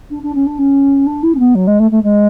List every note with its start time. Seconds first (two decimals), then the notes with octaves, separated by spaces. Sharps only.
0.10 D4
0.23 D4
0.35 C#4
0.46 D4
0.58 C#4
1.06 D4
1.23 E4
1.34 C#4
1.39 B3
1.55 F#3
1.67 G#3
1.79 A3
1.91 A3
2.03 G#3